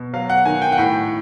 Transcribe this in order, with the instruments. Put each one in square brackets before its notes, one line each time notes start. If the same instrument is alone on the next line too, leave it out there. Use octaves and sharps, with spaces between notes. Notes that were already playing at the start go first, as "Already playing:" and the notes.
Already playing: [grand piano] B2
F#3 F5
F#5
D#3 G#5
G5
F#5
A2 G5